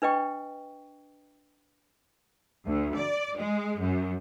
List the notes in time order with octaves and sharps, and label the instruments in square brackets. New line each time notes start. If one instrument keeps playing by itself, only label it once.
[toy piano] D4 B4 D#5 G5 C#6
[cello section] D2
D5
G#3
F#2